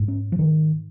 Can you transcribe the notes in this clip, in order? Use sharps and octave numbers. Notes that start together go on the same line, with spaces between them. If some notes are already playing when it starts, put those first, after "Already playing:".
Already playing: G#2
C#4
F3
D#3